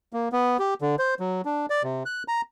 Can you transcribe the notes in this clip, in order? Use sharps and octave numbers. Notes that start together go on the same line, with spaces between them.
A#3
B3
G4
D3
C5
F#3
D4
D5
C3
F#6
A#5